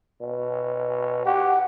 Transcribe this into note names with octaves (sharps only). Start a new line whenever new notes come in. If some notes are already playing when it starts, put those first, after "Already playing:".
B2
G4 F#5